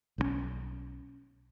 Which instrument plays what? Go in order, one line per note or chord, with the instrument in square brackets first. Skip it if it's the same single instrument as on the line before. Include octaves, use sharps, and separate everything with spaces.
[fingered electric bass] B1 D#3 C#4